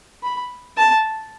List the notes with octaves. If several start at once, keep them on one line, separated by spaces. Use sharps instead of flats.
B5
A5